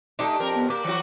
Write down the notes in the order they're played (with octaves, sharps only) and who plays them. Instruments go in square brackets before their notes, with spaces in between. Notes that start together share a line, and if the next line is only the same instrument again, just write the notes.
[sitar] A3 D#4 [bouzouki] D4 G4
[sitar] F2 A#4
[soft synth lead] B3
[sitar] A#3 [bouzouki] G4 [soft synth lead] D6
[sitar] E3 F#3 F#4